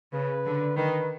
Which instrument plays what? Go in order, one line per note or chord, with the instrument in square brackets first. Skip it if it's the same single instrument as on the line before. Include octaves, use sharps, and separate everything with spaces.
[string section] C#3 [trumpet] B4
[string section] D3
[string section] D#3 [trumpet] B4